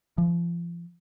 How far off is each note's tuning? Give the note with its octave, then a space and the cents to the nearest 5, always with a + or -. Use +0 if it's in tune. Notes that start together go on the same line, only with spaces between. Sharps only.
F3 -35